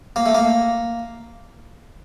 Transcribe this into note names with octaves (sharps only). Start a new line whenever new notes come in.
A#3
A3
A#3